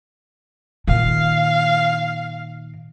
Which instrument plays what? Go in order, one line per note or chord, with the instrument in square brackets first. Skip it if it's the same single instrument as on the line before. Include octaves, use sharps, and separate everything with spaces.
[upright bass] A#2 D#3 [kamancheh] F5